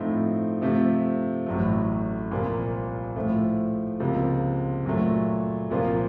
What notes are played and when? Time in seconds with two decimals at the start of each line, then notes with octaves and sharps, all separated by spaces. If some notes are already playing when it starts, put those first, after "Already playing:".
Already playing: A2 F3 A3 C4 D#4
0.62 C3 F3 A3
1.46 A1 A2 F#3 A3
2.31 C2 A#2 F3 A#3 F4
3.16 A2 F3 A3
4.00 C#2 C3 F3 A#3
4.85 A#2 F#3 A3
5.70 C2 A#2 F3 A#3 F4